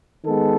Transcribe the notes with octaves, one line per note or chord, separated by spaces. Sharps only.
D#3 G#3 B3 A4